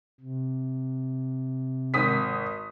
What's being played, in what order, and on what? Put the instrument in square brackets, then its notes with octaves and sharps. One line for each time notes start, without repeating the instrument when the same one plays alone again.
[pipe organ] C3
[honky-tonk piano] G#1 D#6 B6